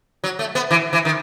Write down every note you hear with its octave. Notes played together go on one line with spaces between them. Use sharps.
F#3
A3
B3
E3
E3
D#3